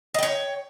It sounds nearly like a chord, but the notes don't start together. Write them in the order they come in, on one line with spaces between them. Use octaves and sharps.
D#5 G5 C#5